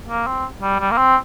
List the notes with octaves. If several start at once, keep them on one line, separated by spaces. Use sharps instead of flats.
A#3
C4
G3
G3
A#3
C4